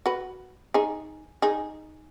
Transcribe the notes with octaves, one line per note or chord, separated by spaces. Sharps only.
F#4 B4
D#4 G#4
D#4 G#4